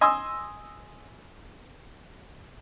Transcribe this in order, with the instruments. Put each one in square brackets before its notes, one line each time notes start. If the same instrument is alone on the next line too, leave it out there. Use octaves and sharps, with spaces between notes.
[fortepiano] D#5 G#5 C6 D#6 E6